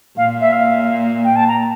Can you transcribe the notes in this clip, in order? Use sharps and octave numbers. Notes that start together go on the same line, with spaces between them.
A#2 F5
E5
F5
G5
A5
A#5